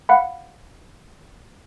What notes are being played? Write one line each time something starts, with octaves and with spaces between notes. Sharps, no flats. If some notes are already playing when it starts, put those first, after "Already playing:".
F5 F#5 B5